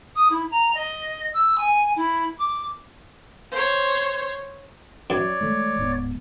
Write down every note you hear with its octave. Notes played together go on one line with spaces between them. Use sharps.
D#6
E4
A#5
D#5
E6
G#5
E4
D6
C5 C#5
F#2 C#5 D5
E3 G#3 A3
D1 G#2 B3